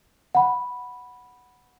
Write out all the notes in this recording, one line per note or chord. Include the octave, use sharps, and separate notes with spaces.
F#5 B5